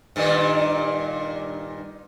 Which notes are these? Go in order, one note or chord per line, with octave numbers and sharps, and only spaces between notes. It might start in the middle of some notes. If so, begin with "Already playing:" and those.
G2 A#2 D#3